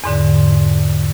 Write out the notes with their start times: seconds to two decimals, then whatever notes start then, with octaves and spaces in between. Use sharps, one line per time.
0.04 E2 G#2 D3